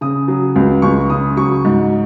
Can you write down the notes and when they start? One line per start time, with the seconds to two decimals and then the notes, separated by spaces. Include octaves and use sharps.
0.01 C#3 D#6
0.28 F#3
0.56 C#2
0.82 C#2 C#6
1.10 C#3 D#6
1.37 F#3 C#6
1.65 G#2